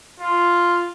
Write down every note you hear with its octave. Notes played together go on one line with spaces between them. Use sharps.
F4